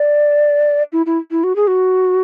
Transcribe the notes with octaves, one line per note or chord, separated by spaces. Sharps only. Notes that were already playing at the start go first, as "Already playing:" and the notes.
Already playing: D5
E4
E4
E4
F#4
G#4
F#4